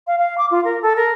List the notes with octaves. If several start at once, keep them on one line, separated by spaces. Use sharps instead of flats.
F5
F5
D6
F4
A#4
A4
A#4